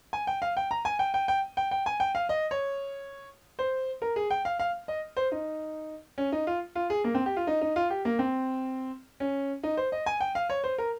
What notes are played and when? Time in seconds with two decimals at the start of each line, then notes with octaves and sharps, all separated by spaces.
0.13 G#5
0.27 G5
0.42 F5
0.57 G5
0.71 A#5
0.85 G#5
0.99 G5
1.14 G5
1.28 G5
1.57 G5
1.71 G5
1.86 G#5
2.00 G5
2.15 F5
2.29 D#5
2.51 C#5
3.59 C5
4.02 A#4
4.16 G#4
4.30 G5
4.45 F5
4.59 F5
4.88 D#5
5.17 C5
5.32 D#4
6.18 C#4
6.32 D#4
6.47 F4
6.75 F4
6.90 G#4
7.04 A#3
7.15 C4
7.26 G4
7.37 F4
7.47 D#4
7.61 D#4
7.76 F4
7.90 G4
8.05 A#3
8.19 C4
9.20 C#4
9.63 D#4
9.77 C5
9.92 D#5
10.06 G#5
10.20 G5
10.35 F5
10.50 C#5
10.64 C5
10.78 A#4